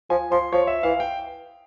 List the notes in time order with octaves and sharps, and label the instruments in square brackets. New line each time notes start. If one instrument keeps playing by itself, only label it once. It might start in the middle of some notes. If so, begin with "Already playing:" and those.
[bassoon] F3 [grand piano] G#5
[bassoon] F3 [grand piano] C6
[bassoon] F3 [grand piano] C#5
[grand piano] E5
[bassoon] E3 [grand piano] F5
[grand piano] G5